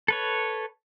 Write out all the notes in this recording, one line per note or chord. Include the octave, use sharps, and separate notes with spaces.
A4 B4 C#5